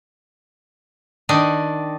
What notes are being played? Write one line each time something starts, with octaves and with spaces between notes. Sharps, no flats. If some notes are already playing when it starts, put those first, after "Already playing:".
D#3 D4 D#4